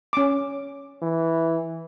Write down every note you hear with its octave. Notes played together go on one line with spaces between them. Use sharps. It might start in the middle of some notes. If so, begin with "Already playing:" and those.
C#4 D6
E3